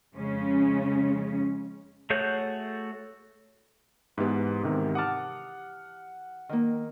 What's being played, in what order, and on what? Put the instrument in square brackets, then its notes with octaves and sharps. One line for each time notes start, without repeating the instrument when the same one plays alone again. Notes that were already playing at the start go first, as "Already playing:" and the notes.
[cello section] F2 C#3 G#3 C#4
[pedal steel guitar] A3 F#4 G#4 C#5 G6
[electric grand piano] G#2 B3 [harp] E3 G4
[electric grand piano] G#2 C3 D#3
[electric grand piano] F#5 F6 [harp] A5 D6 D#6
[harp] D#3 A#3